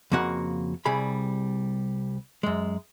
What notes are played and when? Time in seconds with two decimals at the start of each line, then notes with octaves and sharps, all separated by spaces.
0.12 F2 C#3 A#3 F#4 F#5
0.85 C2 G3 G#4 B5
2.43 F#2 G#3